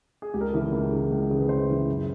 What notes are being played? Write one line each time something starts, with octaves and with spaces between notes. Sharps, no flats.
G#4
C#2 G4
A#4
A4
C#3 E3
A#4
C#2 A#4
C#3 E3
C#2
C#3 E3
B4
C#2 C5
C#3 E3
F#2